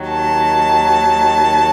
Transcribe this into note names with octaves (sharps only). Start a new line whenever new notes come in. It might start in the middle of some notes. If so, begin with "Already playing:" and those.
Already playing: D#2 D#3 F#3
A5